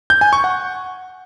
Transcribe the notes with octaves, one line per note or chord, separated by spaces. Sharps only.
G6
G#5
C#6
F#5